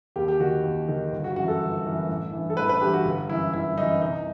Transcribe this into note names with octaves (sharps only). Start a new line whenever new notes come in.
D#2 G4
G4
D#3 F#4
D#2
D#3
G1
F#4
F#2 E3 F#4
A4
G1
F#2 E3
A1
G2 E3
A4
A1 B4
B4
G2 E3 G4
F#4
G1
F#2 E3 E4
G1 E4
F#2 E3 D#4
C2 D#4